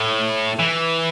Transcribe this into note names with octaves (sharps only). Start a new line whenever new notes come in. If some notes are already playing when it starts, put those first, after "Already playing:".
Already playing: A2
E3